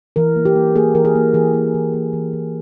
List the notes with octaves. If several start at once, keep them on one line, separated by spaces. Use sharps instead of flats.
E3 A#4
A#3
G4
A#3
A#3 G#4
E3 A#4
G#4
A#3
E3 G#4
A#3
E3
A#3
E3
E3